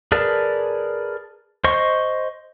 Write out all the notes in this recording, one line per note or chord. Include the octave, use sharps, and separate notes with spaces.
G#4 A#4 B4 D5 A5
C5 D#5 C6 C#6